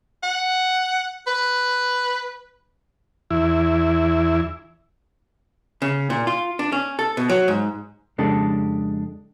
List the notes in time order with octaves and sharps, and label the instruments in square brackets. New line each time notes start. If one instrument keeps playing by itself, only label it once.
[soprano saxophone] F#5
B4
[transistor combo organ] E2 E4
[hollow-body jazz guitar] C#3
A#2
F4
D4
C#4
A4
B2
F#3
G#2
F2 C#3 G#3 D4 G4 A4